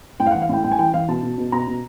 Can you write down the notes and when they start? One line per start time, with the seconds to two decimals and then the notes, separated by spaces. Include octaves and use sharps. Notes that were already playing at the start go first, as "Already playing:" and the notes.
0.20 A2 G5
0.26 F5
0.31 E3 F#5
0.42 F5
0.49 A2 G5
0.64 A2 G5
0.72 G#5
0.79 E3 G5
0.94 E3 F5
1.08 B2 A5
1.23 B2
1.38 B2
1.52 B2 A#5
1.67 B2